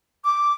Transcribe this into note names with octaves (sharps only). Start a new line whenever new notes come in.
D6